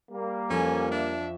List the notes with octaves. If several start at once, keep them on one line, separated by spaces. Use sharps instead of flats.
G3 A#3
F2 C#4 A4 G#5
D4 E5